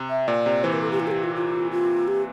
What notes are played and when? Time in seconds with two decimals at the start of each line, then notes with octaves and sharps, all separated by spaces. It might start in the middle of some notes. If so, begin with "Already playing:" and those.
Already playing: C3
0.10 E5
0.28 A#2 D5
0.46 C3
0.63 E3 C5
0.73 A#4
0.81 A4
0.91 G4
1.00 E4
1.07 A4
1.11 G4
1.24 F4
1.36 F4
1.72 F4
2.08 G4